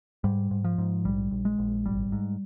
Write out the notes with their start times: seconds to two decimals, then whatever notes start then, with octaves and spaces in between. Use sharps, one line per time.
0.24 G#2 G3
0.51 G#2
0.64 F3
0.78 G#2
1.05 A#1 G3
1.31 A#1
1.45 G#3
1.58 A#1
1.86 G#1 G3
2.12 G#2